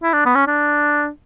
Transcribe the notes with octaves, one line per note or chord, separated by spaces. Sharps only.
E4
D4
B3
C#4
D4